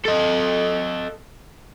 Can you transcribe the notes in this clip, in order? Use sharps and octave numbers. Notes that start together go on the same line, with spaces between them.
A4 D#5